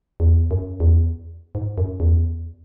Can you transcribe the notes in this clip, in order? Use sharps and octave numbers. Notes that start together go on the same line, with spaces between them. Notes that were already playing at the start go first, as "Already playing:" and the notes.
E2
F#2
E2
G#2
F#2
E2